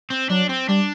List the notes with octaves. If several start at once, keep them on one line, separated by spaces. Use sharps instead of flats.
C4
F#3 D4
C4
G3 D4